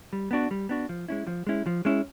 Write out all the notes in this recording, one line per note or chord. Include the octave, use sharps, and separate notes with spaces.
G3
B3 D4 F#4
G3
B3 D4 F#4
F3
G#3 C#4 E4
F3
G#3 C#4 E4
F3
G#3 C#4 E4